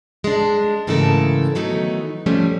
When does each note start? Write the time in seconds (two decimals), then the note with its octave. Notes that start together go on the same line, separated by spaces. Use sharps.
0.24 G#3 D4
0.87 G#2 C#3 E3 A3 A4 A#4
1.55 D#3 E3 F#3 A3 B3 D#4
2.26 F3 G3 A3 C#4